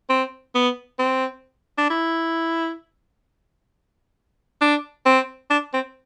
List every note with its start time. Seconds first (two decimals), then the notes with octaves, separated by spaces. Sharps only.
0.09 C4
0.55 B3
0.99 C4
1.78 D4
1.90 E4
4.61 D4
5.06 C4
5.50 D4
5.73 C4